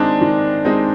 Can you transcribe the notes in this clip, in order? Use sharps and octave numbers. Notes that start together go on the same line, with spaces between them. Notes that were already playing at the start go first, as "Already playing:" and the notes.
Already playing: D#3 G#3 C4 D4 D#4
D#3
G#3 C4 D#4